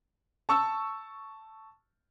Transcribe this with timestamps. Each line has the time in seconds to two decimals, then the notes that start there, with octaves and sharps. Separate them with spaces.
0.49 A5 C#6 E6